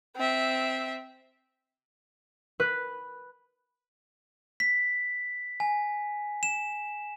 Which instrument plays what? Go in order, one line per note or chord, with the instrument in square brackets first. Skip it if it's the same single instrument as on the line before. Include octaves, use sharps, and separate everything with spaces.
[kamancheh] C4 E5
[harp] B4
[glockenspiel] B6
G#5
E7